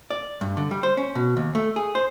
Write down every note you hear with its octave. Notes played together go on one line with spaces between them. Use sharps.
D5
G2
D3
G3
C5
C#4
B2
D#2
A3
G#4
C5